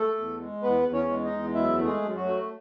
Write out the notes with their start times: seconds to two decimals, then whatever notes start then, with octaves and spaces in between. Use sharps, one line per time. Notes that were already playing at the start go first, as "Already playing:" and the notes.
Already playing: A3 A4
0.16 E2
0.40 G#3
0.62 E2 B3 B4
0.86 E2
0.93 C#4 C#5
1.09 G#3
1.24 D#4 D#5
1.32 E2
1.54 F#2 E4 E5
1.78 A3
1.86 G#3 G#4
2.01 F#2
2.17 F#3 F#4
2.24 A3